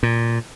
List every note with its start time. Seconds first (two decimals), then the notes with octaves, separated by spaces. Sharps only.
0.03 A#2